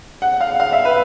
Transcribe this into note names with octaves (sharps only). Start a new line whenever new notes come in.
F#5
F5
F5
E5
B4